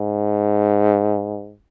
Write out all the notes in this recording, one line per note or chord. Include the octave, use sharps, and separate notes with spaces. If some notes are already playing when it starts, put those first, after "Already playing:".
Already playing: G#2